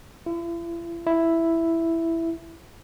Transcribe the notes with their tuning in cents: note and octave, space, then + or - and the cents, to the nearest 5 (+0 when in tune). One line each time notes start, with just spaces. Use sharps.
E4 +45
E4 +5